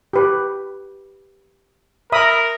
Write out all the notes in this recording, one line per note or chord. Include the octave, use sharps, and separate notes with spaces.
G4 B4
A#4 E5 B5 D#6